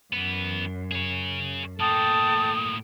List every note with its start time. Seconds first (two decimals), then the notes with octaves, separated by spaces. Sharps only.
0.13 F#2 E3 B3
0.92 G#4 C#5
1.80 A2 A#3 A4 G5 A5 D#6